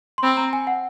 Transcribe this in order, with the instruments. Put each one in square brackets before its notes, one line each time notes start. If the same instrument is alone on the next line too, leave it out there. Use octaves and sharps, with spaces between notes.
[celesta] C6
[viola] C4 [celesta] B5
[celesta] A#5
G#5
F#5